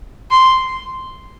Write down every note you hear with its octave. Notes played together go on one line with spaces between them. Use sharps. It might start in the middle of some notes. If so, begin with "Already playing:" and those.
C6